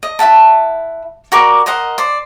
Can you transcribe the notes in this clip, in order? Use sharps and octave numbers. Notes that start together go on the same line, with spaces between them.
D#5
E4 E5 F#5 A5
F#4 A#4 D5 D6
A#4 C5 D#5 F#5
C5 D5